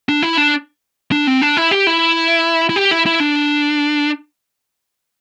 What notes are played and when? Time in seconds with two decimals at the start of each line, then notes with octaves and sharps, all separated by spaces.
0.09 D4
0.22 E4
0.37 D4
1.12 D4
1.27 C4
1.42 D4
1.57 E4
1.71 G4
1.87 E4
2.69 E4
2.76 G4
2.91 E4
3.06 E4
3.20 D4